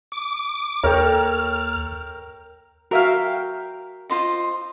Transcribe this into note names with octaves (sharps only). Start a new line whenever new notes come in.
D6
D#2 A4 A#4 C#5 G5 F6
F#4 A#4 E5 F5 G5
F4 C5 D#5